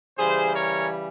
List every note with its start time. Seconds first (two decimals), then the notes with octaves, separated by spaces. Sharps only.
0.18 C#3 E3 G3 G#4 C5
0.55 A#4 C#5